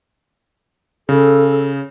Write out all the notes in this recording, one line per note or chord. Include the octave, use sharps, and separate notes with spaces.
C#3 A4